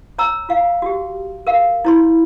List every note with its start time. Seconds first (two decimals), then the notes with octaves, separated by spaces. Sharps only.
0.18 C#5 A#5 E6
0.49 F4 F5
0.82 F#4 G4
1.47 A#4 F5
1.85 E4 C#5 C6